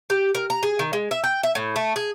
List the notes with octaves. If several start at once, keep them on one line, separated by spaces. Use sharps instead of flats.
G4
A#4
A#5
G#4
D#3
G#3
E5
G5
E5
A2
A3
G#4